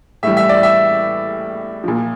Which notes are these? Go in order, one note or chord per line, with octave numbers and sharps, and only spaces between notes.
A2 E3 G3 E5
E5
D5
E5
A#2 F3